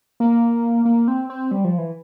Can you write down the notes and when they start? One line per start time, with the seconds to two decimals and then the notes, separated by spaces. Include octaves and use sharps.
0.20 A#3
0.85 A#3
1.08 C4
1.30 C4
1.51 G3
1.64 F3
1.78 E3